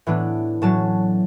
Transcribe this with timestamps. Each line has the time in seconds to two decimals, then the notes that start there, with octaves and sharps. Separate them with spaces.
0.07 A2 E3 B3 D4
0.62 A2 F#3 C#4 A5